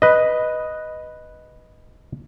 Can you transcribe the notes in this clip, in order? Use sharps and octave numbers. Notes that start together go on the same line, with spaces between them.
B4 D#5